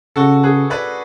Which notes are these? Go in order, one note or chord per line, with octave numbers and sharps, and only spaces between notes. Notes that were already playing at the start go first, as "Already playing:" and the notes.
C#3 F#4 A4
G#4 B4
B4 D5